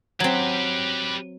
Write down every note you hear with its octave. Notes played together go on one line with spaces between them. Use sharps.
F#3 C4 G4 B4